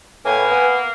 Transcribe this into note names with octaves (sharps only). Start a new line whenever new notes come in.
A2 A#3 B4 G#5
B3